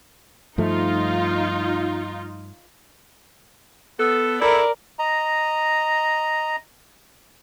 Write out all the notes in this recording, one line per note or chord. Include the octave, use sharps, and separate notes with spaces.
G2 F3 A3 D#4 F4
B3 A4
E4 A4 A#4 D5
D#5 A#5